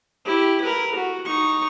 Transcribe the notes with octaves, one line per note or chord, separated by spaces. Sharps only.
E4 G4
A#4 B4
F#4
D#4 C#6